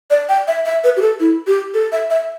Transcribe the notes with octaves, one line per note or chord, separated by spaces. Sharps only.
D5
G5
E5
E5
B4
G4
A4
E4
G4
A4
E5
E5